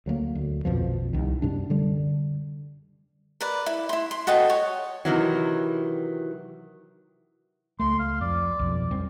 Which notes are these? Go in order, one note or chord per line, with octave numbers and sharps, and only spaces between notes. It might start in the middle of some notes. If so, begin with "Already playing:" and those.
D2 F#3 G3 A#3
D2
A#1 F2 B2 F3
C2 D#3
F#2 C3 G3 D4
D3 G3
A#4 B4 D5
E4
E4 C6
C6
F#4 A4 D#5 G5
C#5
C3 D#3 E3 F#3
C#2 A3 C6
F5
F2 D5
B1 F2
F2 G3 C4